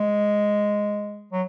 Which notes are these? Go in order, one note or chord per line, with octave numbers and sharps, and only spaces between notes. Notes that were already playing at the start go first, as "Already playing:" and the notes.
Already playing: G#3
F#3